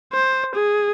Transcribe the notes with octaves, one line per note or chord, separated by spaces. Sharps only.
C5
G#4